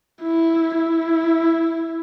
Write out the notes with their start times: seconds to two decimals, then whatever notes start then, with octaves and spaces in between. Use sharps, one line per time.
0.23 E4
0.77 E4